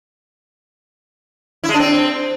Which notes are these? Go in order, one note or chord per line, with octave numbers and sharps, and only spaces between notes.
E4
G#3
D4
C4